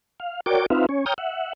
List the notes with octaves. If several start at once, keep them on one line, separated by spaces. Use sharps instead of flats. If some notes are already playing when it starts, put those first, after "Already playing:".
F5
F#4 A#4 C#5 D5 G5 D6
C4 D#4 F4 B4 E5 F5
C#4 C#5
C#5 G5 A#5 D#6 F6 G6
E5 F#5